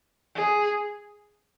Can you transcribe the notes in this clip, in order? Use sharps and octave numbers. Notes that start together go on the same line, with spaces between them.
G#4